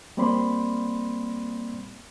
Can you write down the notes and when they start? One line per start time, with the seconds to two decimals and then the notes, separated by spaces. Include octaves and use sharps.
0.17 G3 A#3 C4 D5 B5 C6